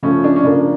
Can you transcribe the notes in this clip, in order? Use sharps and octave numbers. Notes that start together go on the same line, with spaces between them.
C#3 F3 A3 C#4
D4
C#4
C#3 F3 A#3 D4